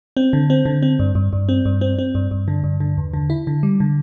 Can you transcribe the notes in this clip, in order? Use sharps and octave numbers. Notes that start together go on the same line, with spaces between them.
C4
D3
C4
D3
C4
G2
G2
G2
C4
G2
C4
C4
G2
G2
D3
G2
D3
E2
D3
E4
D3
G3
D3